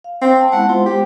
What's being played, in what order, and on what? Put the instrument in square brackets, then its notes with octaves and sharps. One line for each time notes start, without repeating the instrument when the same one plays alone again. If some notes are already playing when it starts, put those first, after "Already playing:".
[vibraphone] F5
[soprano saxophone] C4
[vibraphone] A5
[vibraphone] G#3 B3 E4 [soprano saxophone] F#5
[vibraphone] G#3 C5 [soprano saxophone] F4
[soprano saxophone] G4